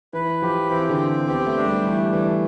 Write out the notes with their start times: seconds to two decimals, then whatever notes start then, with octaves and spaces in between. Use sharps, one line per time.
0.13 E3 B4
0.42 F3 G4
0.70 E3 C4
0.89 D3
0.99 C4
1.28 B3 G4
1.46 A3
1.56 D4
1.65 G3
1.84 E3 A3
2.12 E3 A3